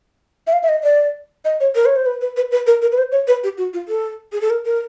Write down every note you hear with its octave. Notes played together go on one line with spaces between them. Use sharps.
E5
F5
E5
D#5
D5
D#5
C#5
A#4
C#5
C5
B4
B4
B4
B4
A#4
A#4
B4
C5
C#5
B4
G4
F#4
F4
A4
G#4
A4
A#4
A#4